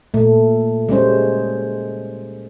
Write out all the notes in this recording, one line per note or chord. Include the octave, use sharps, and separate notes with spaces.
A#2 A3
G3 G#3 C#4 C5